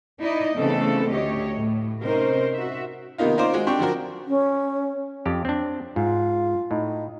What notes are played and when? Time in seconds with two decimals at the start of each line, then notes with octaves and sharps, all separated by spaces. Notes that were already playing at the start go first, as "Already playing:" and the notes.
0.21 D#4 E4 D5 D#5
0.55 C#3 E3 A3 B3 C4 A4
1.10 D2 G4 C#5 D#5
1.56 A2
2.02 C3 C#4 D#4 A#4 C5
2.54 F#4 E5
3.18 C3 D#3 A#3 B3 D#4 F4
3.37 C#4 D#4 F4 A#4 C5 D5
3.53 G#3 F#4
3.67 C4 D4 G4 G5 C#6
3.79 D3 F3 D4 F#4 A#4
4.27 C#4
5.26 F2 G4
5.45 C4 D4
5.96 G#2 F4
6.71 A2 D#4